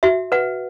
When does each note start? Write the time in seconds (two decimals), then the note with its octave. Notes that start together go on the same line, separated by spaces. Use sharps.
0.03 F#4 E5
0.32 B4 F#5